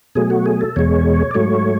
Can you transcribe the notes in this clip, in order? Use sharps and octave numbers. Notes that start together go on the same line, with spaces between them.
B2 F#3 A3 G#4
F#4
G#4
A4
E2 B2 G#3 C#5
D5
G#2 F#3 A3 C#5